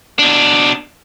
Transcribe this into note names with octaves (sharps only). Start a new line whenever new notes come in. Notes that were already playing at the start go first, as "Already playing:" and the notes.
B2 D4